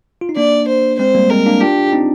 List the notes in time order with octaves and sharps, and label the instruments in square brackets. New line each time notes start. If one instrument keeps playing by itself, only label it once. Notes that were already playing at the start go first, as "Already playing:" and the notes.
[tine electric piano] F4
D#4
[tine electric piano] A#3 D4 [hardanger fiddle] D5
[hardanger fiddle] C5
[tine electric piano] G#3 C4 [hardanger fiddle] C5
[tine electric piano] G3 A#3
[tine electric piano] G#3 C4 [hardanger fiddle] A#4
[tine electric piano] A#3 D4
[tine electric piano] D4 F4 [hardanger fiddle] G4
[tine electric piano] C4 D#4